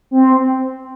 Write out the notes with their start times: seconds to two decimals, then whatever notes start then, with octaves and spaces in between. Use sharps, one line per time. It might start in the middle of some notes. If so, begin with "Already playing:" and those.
0.11 C4